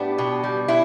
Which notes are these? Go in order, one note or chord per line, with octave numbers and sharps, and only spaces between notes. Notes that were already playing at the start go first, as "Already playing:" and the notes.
Already playing: A2 B3 D4 G4
B2
G3
B2 E4